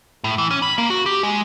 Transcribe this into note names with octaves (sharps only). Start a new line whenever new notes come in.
A2
E3
C#4
B5
A#3
F#4
G4
G#3